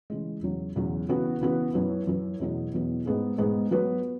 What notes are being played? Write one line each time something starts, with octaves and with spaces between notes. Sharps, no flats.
C#3 E3 G#3
E2 C#3 F#3
E2 C#3 F#3
C#3 E3 B3 F#4 B4
C#3 E3 B3 F#4 B4
F#2 F#3 E4 B4
F#2 F#3 E4 B4
E2 B2 F#3 B3 E4
E2 B2 F#3 B3 E4
G#2 G#3 B3 G#4
G#2 G#3 B3 G#4
F#3 B3 F#4 B4